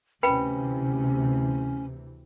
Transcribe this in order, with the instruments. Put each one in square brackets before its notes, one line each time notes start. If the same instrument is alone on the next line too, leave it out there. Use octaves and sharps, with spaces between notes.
[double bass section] D2 C3 E3 [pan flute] C#4 [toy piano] B4 G5 B5